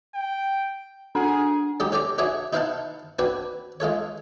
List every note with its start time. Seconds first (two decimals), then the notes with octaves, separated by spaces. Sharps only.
0.14 G5
1.15 D4 G#4 A4 F#5
1.80 F#3 G#3 D#4 G4
1.92 C#4 G4 A4 D5 A#5
2.18 D4 F#4 G#4 C#5 E5
2.53 D#4 E4 C5 F5 F#5 A5
3.19 C4 D4 F#4 B4
3.80 G#3 F4 A4 C#5